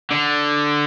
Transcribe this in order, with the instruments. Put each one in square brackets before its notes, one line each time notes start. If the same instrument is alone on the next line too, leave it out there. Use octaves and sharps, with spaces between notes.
[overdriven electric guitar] D3